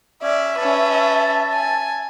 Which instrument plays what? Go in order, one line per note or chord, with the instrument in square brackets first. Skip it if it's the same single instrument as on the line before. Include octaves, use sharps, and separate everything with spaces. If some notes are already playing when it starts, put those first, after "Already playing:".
[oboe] C#4 [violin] D5 [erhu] E5
[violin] C#4 B4 [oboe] A5
[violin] G#5